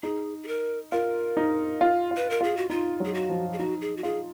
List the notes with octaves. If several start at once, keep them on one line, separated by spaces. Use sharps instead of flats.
D#4 G#4
G#4
A#4
F4 A#4
D#4
F4
F4
B4
A#4
F4 G#4
F#4
D#4 F4
F#3 G#4
F#4
F3
G#4
D#4 F#4
G#4
F#4
F4 G#4